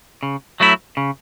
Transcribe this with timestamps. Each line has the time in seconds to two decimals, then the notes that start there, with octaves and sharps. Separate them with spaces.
0.23 C#3
0.60 F#3 A3 E4
0.97 C#3